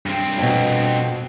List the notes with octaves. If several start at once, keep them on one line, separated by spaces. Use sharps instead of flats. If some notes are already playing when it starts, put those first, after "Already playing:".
G2 C4
F2 B2